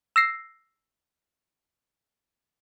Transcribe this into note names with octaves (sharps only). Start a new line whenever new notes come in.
E6 A#6 C7